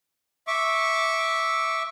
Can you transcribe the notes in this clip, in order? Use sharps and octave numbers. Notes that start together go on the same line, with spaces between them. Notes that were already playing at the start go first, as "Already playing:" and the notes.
E5 C#6 D6